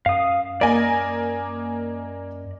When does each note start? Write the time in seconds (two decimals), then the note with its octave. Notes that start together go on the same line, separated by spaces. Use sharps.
0.06 F#2 F5 D#6
0.61 A#3 D5 D#5 G#5